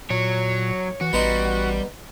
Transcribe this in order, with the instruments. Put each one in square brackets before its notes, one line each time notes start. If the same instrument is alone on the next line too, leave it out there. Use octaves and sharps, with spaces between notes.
[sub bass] A#2 [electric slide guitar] F#3 [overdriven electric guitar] C#5
[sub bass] E3 [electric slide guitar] F#4
[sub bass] A1 [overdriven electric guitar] G3 [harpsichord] B3 D#4 C6